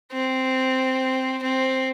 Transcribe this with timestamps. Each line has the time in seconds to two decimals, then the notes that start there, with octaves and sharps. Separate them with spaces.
0.12 C4
1.42 C4